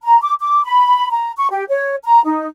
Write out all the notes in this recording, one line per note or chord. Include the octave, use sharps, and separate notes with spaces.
A#5
D6
D6
B5
A#5
C#6
G4
C#5
A#5
D#4